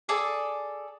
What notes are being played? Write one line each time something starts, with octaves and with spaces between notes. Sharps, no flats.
G#4 A4 D5